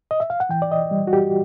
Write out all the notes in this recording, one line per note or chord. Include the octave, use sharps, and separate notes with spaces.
D#5
E5
F5
F#5
E3 G5
D5
D#5
G3
F#4
G4